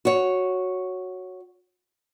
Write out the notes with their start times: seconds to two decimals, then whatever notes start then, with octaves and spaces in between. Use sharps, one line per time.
0.05 F#4 C#5